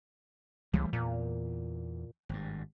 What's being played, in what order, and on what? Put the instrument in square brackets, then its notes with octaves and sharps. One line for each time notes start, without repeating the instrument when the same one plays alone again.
[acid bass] C#2 [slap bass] E3 G3 A3
[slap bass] E2 [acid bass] A#2
[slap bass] G#1 G2